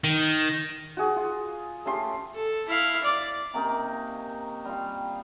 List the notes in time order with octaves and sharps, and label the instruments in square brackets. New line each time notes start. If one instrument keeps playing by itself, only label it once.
[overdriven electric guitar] D#3
[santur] F#4 G#4
F4
A3 C#4 G4 C6
[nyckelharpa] A4
E4 F5
D5
[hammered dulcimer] C3 A#3 C#4 D#4
G3 F4